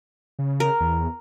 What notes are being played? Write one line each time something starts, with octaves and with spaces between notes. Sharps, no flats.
C#3
A#4
E2